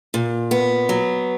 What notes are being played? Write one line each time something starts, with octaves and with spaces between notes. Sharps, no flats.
A#2
B3
F#3